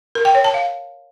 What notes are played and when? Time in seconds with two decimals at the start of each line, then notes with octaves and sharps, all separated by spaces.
0.15 A#4
0.25 G5
0.35 C#5
0.44 A5
0.54 F5